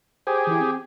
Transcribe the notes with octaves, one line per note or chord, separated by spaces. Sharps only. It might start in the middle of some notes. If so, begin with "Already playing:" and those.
G4 G#4 C5
E3 E4
C4